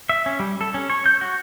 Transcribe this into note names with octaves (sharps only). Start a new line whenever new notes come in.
E5
C#4
G3
A4
C#4
C#5
G6
F#4